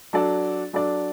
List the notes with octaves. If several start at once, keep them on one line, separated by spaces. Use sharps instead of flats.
F#3 D4 A4 D5
F#3 D4 A4 D5